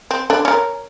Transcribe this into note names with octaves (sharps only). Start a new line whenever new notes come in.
C4
D3 D4
C#4 A#4